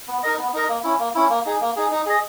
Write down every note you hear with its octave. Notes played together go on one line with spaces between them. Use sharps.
B3
D#4 A#4 D#5
B3
D#4 A#4 D#5
A#3
C#4 E4
A#3
C#4 E4
A#3
D#4 G#4
A#3
D#4 G#4
D#4
G#4 D#5